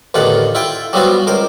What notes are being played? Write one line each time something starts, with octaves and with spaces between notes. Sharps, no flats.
A1 E2 D3 D#3 F4 F#5
E4 F4 G5
F#3 G3 B3 C4 F4 F#4
C#2 A#4 C5